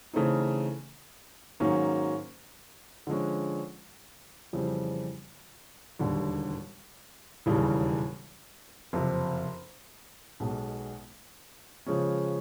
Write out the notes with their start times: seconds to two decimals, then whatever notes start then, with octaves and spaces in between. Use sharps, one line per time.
0.13 C#3 E3 A3 C4 D#4
1.60 G#2 D#3 F#3 A#3 C#4
3.07 D3 F3 G#3 C#4
4.53 F2 C#3 E3 G3 C4
5.99 E1 D#2 D3 G3
7.46 E1 D#2 C#3 E3 G3
8.93 F#1 F2 C3
10.40 B1 B2 G#3
11.86 C#3 F3 G#3 C#4